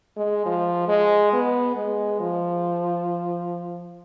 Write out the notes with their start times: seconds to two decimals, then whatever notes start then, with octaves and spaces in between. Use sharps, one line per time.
0.17 G#3
0.46 F3
0.88 G#3
1.33 B3
1.76 G#3
2.20 F3